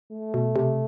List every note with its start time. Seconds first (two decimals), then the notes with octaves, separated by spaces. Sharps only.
0.11 A3
0.34 B2
0.56 C3